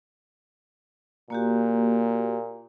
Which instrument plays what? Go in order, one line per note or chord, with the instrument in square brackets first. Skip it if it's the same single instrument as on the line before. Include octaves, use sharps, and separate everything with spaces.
[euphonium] A#2 [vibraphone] A#3 F#4 G4